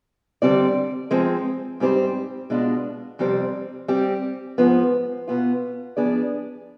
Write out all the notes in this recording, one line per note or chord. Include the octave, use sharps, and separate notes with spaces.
D3 G3 C4 G4 D5
F3 G#3 C4
G#2 G3 C4 G4 C5
B2 G#3 D4 F4
F2 C3 G3 C4
G3 C4 G4
G#2 F3 B3
B2 B3 F4
F3 B3 D4 G#4 D5